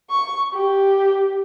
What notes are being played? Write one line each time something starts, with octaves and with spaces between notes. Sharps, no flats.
C#6
G4